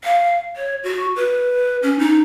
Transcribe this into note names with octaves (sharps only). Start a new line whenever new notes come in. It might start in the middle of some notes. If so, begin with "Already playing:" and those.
F5
C#5
F#4
B4
C#4
D#4